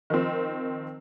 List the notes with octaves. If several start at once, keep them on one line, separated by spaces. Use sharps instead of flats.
D#3 F3 C4